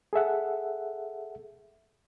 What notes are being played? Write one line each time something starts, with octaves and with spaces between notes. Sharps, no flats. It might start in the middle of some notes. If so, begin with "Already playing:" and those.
G#4 A4 E5 F#5